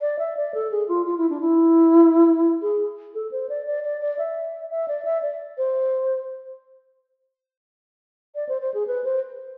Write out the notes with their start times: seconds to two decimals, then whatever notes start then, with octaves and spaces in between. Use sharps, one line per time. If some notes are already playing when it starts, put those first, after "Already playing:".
0.01 D5
0.19 E5
0.37 D5
0.54 A4
0.71 G#4
0.88 F4
1.06 F4
1.18 E4
1.29 D4
1.41 E4
2.62 G#4
3.15 A4
3.31 C5
3.49 D5
3.67 D5
3.84 D5
4.01 D5
4.19 E5
4.70 E5
4.88 D5
5.05 E5
5.22 D5
5.58 C5
8.35 D5
8.49 C5
8.61 C5
8.74 G#4
8.87 B4
9.04 C5